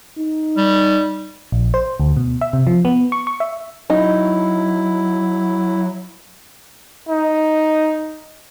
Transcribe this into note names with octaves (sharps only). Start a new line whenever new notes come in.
D#4
G3
A#1
C5
D2
B2
E5
C3
F3
B3
C#6
C#6
E5
F#3 D#4 E4
D#4